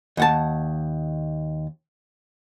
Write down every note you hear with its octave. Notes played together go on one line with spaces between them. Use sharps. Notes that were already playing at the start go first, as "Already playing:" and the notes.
D#2 F#5 A5